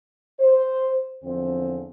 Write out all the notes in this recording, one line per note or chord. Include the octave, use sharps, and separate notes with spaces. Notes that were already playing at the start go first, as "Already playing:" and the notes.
C5
E2 D3 F3 C4